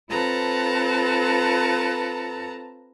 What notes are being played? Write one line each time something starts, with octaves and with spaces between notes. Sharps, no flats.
C4 F4 A4 B4 A5 A#5